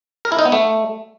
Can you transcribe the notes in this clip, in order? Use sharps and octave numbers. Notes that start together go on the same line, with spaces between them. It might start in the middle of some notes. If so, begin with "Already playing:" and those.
A#4
E4
D#4
B3
A3